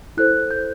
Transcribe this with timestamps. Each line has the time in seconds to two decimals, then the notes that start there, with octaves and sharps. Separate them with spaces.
0.17 E4 A4 C5 F#6
0.51 G6